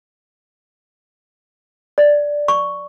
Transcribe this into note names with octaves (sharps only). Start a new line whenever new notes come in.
D5
C#6